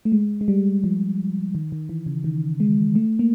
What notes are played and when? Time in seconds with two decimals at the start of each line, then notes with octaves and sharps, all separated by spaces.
0.05 A3
0.12 G#3
0.41 G#3
0.48 G3
0.84 F3
1.55 D#3
1.72 D#3
1.89 E3
2.06 C#3
2.24 D#3
2.60 G#3
2.95 A3
3.19 A#3